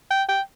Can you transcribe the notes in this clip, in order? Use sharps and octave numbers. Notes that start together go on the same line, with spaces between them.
G5
G5